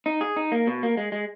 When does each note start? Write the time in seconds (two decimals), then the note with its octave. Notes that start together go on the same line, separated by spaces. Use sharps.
0.06 D#4
0.21 G#4
0.36 D#4
0.52 A#3
0.67 B2
0.83 A#3
0.97 G#3
1.12 G#3